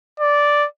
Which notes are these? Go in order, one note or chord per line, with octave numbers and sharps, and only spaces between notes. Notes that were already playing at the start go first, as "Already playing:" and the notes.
D5